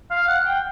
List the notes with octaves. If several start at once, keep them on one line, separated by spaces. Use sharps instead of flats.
F5
F#5
G5